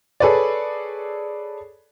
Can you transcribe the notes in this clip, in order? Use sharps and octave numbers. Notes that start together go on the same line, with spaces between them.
G#4 A4 B4 C#5 D5